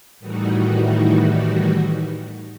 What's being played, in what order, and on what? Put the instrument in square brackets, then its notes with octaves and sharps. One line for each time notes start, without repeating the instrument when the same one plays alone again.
[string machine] A2 D#3 E3 G3 D#4 F#4